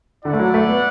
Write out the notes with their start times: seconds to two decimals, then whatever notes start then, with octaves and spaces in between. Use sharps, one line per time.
0.25 D3 E4 D5 F#5
0.33 A3
0.39 F#3
0.54 A3
0.69 B3